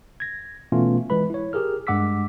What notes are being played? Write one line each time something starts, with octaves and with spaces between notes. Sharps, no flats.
G#6 A#6
B2 E3 A3 B3 C#4 F4
E3 G#3 B4 B5
E4 C#5
G4 G#4 A#4 F6
G2 G#3 F#5 D6 E6 B6